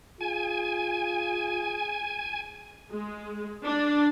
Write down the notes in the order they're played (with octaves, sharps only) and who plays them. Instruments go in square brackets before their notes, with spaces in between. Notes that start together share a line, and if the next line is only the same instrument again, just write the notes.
[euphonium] F4 [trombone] G#4 [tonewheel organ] G#5
[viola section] G#3
D4